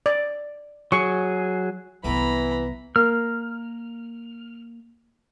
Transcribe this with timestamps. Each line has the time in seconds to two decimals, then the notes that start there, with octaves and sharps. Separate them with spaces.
0.06 D5
0.92 F#3 G#4 C#6
2.04 C2 E3 F#3 B3 E4 A4 A#5 B5
2.96 A#3 F6